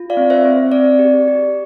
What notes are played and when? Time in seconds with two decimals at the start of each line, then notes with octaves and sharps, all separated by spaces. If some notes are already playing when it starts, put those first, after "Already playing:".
Already playing: F4
0.10 D5 F5
0.17 C4
0.30 C5 E5
0.45 C4
0.72 C4 D5
0.99 G4
1.28 G4